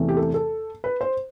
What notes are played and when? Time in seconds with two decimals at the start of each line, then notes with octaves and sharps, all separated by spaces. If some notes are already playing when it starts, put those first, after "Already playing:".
Already playing: E2 C3 E3 A3
0.09 G4
0.17 A4
0.34 A4
0.84 B4
1.01 C5